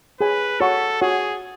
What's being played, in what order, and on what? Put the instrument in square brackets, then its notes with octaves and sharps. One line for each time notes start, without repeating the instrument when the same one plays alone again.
[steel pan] G#4 C#5 G#5 [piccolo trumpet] B4
[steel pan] F#4 C#5 F#5 C#6 [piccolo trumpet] A4
[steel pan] F#4 C#5 F#5 C#6 [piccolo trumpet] G#4